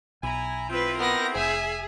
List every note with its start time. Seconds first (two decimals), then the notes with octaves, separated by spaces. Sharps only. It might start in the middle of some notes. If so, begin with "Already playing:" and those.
0.23 B1 E4 G#5 A#5
0.70 C4 E4 F4 B4
0.99 B3 A#4 A#6
1.35 F1 G#4 E5 G#5